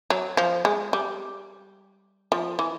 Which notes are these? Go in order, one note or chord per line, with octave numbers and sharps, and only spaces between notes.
F#3
F3
G#3
G3
F3
E3